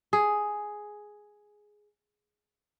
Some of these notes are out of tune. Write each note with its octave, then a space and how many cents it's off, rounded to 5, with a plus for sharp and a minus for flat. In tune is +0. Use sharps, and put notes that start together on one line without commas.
G#4 +5